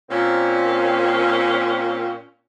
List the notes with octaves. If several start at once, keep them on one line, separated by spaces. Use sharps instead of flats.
A#2 C4 C#4